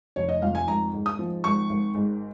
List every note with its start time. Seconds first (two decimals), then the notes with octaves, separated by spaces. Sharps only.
0.16 F1 C#5
0.29 D#5
0.42 F2 F5
0.55 G#5
0.68 G#1 A#5
0.93 G#2
1.06 D#6
1.19 F3
1.44 G#1 C#6
1.69 G#1
1.95 G#2